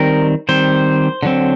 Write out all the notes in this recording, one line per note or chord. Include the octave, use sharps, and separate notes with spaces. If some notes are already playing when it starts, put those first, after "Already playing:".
Already playing: D#3 G3 C4 A#4
D#3 G3 C4 C5
D3 F#3 C4